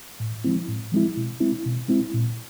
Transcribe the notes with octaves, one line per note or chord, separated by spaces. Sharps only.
A2
F3 G#3 C4 E4
A2
F3 G#3 C4 E4
B2
G#3 C4 E4
B2
G#3 C4 E4
A#2